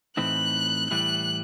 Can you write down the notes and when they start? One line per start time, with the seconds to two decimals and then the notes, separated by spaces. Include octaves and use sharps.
0.17 A2 E3 A3 C4 D#4 F#6
0.91 A2 E3 G3 F#6